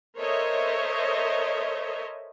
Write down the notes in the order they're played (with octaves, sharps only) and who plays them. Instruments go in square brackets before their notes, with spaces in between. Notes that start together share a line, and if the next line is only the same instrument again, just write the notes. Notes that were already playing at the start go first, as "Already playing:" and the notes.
[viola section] A4 A#4 C5 C#5 D#5 E5